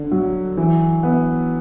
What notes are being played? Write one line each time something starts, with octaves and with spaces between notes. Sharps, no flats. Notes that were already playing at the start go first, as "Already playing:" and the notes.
Already playing: D3
F#3
E3
B3